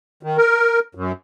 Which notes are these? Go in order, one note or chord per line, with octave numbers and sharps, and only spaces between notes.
D#3
A#4
F#2